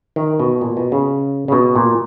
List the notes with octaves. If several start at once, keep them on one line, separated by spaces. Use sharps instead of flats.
D#3
B2
A#2
B2
C#3
C#3
B2
A#2